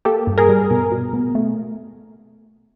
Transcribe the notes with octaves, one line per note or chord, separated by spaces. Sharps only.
A#3 G4 A4
G2
G#4 A#4
G3
B2
B2
B3
A3